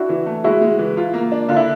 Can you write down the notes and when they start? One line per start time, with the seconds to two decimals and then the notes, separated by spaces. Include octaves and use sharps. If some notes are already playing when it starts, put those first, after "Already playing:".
Already playing: D4 E4 F#4
0.09 E3
0.26 A3
0.44 G#3 E4 F#4
0.61 G#3
0.79 E3
0.97 F4
1.14 A#3
1.32 D4
1.49 D3 F4
1.57 E4